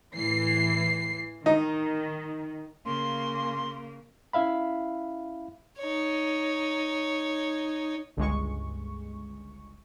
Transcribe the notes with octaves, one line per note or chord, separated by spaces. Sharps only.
A2 E3 C7
D#3 D#4
C#3 A#3 C6
C#4 E4 E5 F5 B5
D#4 C#5
G1 C#2 G#3 C#6